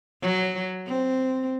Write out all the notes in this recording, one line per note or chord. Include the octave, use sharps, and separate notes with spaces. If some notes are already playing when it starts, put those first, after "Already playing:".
F#3
C4